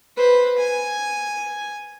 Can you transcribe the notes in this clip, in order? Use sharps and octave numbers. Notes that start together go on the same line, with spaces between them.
B4 C5
G#5